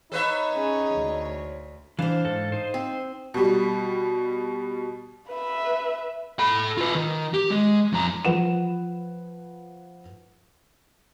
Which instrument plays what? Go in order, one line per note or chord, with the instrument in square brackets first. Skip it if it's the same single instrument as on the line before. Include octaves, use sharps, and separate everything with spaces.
[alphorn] D#4 [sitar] A4 B4 E5 [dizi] C#5
[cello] C#4 G#4
D2
[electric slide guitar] E3 D4 [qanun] C5 F5
[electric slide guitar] G#2 A4
D#4 C5
[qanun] C4
[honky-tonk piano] B2 G3
[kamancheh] B4 E5
[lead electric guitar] A4 B5
F4 B4
D#3
G4
G#3
F2 A#5
[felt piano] F3 B4 F#5 E7